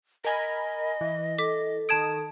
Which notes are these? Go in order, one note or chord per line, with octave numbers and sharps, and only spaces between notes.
A#4 D#5 G#5 B5
E3
A4 D6 B6
D#3 A5 D#6 G#6 D7